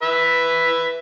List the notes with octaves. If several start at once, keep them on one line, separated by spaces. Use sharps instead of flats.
B4 E5